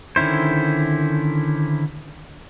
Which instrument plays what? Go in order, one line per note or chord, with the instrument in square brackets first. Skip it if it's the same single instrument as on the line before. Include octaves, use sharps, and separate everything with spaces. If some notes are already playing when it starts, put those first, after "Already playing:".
[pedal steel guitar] D3 D#3 C#4 E4 C5